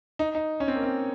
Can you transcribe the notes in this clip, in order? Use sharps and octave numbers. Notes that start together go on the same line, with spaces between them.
D#4
D#4
C#4
C4
A#3
C4